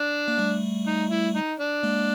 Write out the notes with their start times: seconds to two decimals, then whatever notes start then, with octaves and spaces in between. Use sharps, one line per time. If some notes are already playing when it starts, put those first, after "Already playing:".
Already playing: D4
0.28 A#3
0.38 G3 A3
0.87 D#4
1.11 E4
1.36 D#4
1.60 D4
1.83 G#3 A#3